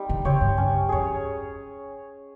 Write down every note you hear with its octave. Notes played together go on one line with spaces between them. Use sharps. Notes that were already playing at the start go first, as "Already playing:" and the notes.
Already playing: G3 C4 D#4
D#3
C#3 C4 G4 C#5
G2
C#4
F2 G#4 C#5